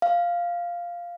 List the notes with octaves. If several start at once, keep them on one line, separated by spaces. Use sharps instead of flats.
F5